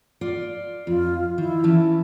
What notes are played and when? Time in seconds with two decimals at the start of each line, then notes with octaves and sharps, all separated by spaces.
0.21 F4 D5
0.87 F2 F4
1.38 D#3 E4
1.64 E3 C#4 A5